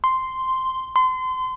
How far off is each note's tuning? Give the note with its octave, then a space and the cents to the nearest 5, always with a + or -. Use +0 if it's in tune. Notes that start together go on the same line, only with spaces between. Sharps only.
C6 -5
C6 -30